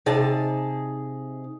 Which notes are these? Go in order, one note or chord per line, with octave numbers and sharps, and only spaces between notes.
C3 D#4 G#4 A5